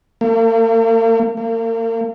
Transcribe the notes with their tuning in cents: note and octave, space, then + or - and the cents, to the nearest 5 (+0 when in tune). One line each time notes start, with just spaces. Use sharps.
A#3 -45
A#3 -40